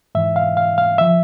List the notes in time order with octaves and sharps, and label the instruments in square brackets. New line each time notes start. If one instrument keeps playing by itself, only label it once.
[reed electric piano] G#2 E3 E5
F5
F5
F5
F3 E5